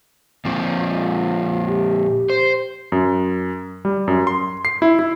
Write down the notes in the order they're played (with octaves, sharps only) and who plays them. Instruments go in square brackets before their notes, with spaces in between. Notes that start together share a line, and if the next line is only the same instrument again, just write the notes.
[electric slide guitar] A#2 F3 C4
[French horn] F4
G4
[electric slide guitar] C5
[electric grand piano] F#2
G3
F#2
C6
C7
E4
E4